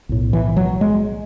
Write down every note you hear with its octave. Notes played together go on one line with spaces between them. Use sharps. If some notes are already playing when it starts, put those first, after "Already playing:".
B1 A2
E3
F#3
G#3